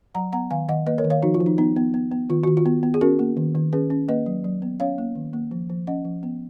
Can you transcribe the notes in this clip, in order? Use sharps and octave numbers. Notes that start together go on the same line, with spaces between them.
F#3 F#5 A#5
B3 F#5 A#5
D#3 F5 G#5
D#3 D#5 F#5
A#3 B4 D#5
A#4 C#5
D#3
C#5 F5
F3 D#4 F#4
F4
F3
D#4
B3 D#4
B3
B3
B3
D#3 F4
D#3 F#4
F4
B3
B3
G#4
C#4 F#4 A#4
A#3
D#3
D#3
C#4 G#4 B4
C#4
A#3 B4 D#5
F#3
F#3
B3
C#4 C#5 F5
A#3
D#3
A#3
F3
F3
C#4 D#5 F#5
F3
B3